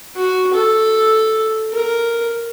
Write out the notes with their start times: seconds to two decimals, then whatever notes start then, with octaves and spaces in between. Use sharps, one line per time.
0.16 F#4
0.53 A4
1.71 A#4